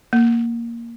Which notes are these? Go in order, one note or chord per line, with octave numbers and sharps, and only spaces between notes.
A#3